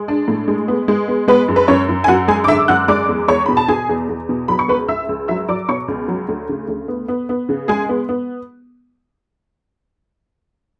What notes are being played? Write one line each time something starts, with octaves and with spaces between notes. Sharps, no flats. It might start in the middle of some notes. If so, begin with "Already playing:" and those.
Already playing: G#3
D4
A2
G#3
B3
G#3
B3
G#3 B3 B4
F#2
B4
F#2 C#4 C#5
F#2
G#5
F#2 F#4 F#5
G#3 G#4 G#5
D6
D3 E5 E6
F#2 F#5 F#6
G#3 D5 D6
E2
E2 C#5 C#6
B2 B5
A5
B2 G#4 G#5
E2
E2
B2
F#3 B5
C#6
C#2 B4 B5
C#2 E5 E6
C#2
F#3 E5 E6
F#3 D5 D6
B2 C#5 C#6
C#2
F#3
D2
C#3
D2
B3
B3
B3
C#3
G#3 G#4 G#5
B3
B3